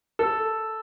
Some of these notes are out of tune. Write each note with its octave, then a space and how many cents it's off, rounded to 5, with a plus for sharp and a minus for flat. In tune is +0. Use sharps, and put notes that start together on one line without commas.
A4 +0